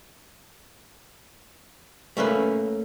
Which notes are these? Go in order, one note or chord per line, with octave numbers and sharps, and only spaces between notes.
A3 A#3 C#4 B4